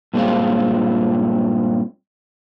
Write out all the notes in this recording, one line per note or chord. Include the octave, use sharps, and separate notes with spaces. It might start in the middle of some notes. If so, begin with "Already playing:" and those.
G2 A#2 G#3 B3 C4 F4